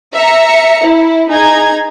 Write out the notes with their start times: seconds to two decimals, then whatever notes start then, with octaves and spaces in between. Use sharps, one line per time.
0.14 E5 A#5 C#7
0.84 E4
1.29 D#4 G#4 A#5 G#6